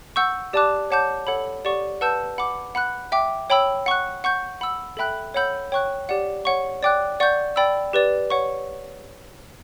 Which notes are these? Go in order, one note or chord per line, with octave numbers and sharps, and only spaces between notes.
F#5 C#6 E6 G6
G4 D5 A5 D6 F#6
C#5 F#5 A5 D6 G6
A4 C#5 F#5 B5
G4 D5 F#5 C#6
B4 F#5 A5 E6 G6
F#5 B5 D6
F#5 B5 F#6
E5 G5 D6
C#5 G5 B5 E6
F#5 C#6 F#6
F#5 C#6 G6
F#5 B5 E6
A4 E5 G5 B5 F#6
C#5 F#5 B5 E6 G6
C#5 G5 C#6 F#6
G4 D5 F#5
C#5 F#5 C#6
D5 G5 D6 F#6
D5 F#5 C#6 G6
D5 G5 B5 E6
G4 B4 D5
C#5 F#5 C#6